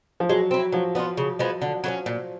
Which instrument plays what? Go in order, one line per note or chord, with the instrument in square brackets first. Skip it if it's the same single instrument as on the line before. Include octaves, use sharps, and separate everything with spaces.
[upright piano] F3
[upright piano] F#3 [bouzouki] G#3
[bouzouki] C4 E4
[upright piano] F3 [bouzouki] F#3
[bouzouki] B3 D4
F4
C#3
F3 G#3 B3
D3
F#3 A3 C#4
A#2